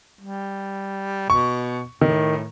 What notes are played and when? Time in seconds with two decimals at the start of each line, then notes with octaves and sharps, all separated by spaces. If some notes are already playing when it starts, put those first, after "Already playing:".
0.21 G3
1.30 B2 C#6
2.01 A2 D#3